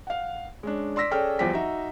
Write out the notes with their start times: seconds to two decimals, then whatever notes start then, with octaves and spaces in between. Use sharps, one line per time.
0.07 F5 F#5
0.63 G#3 C#4 D4
0.96 D5 C6 E6 A#6 B6
1.11 C#4 G#4 A4 D5 G5 F6
1.39 E2 F3 G3 G4 G5 B6
1.53 D#4 F#4 E5